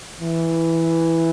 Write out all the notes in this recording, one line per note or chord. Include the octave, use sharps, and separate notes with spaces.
E3